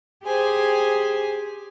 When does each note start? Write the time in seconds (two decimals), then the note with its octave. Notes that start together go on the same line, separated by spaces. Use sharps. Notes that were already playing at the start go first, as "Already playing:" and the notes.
0.24 G4 G#4 C5 G#5